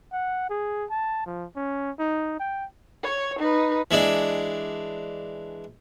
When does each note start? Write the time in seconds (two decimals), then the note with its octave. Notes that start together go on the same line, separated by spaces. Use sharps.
0.12 F#5
0.50 G#4
0.90 A5
1.26 F3
1.56 C#4
1.99 D#4
2.40 G5
3.03 C#5
3.39 D#4 B4
3.91 E3 G#3 D4